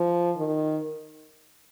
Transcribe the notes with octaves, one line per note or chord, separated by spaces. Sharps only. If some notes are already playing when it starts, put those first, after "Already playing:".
Already playing: F3
D#3